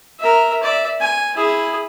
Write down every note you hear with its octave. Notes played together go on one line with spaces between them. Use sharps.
A#4 E5
D5 E5
G#5
E4 G#4